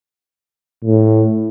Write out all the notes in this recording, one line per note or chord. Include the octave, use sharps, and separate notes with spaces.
A2